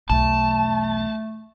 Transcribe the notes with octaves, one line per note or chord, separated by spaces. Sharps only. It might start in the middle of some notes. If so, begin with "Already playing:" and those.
B1 E2 A3 A5